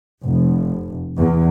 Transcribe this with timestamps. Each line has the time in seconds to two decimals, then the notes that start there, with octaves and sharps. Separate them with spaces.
0.22 F1
1.17 E2